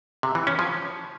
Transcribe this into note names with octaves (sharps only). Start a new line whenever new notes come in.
C3
E3
C#4
F3